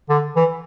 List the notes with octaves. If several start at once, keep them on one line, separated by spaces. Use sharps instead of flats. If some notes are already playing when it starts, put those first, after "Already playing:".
D3
E3